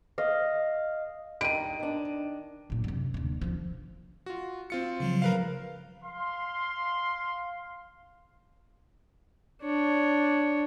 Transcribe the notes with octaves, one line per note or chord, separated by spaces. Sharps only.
D#5 F5
G2 D#3 D7 D#7
D#3 D4
A#2 F#3
F#2 C3
D#2 D3
E1 F3
F4 F#4
C4 F4 C#7
C#3 F3 F#3
A#4 B4 F5
F5 C6
D4 C#5